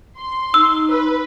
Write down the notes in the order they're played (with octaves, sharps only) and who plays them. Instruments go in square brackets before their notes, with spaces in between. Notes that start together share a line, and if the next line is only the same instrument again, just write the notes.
[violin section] C6
[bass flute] D#4 [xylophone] E6
[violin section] B4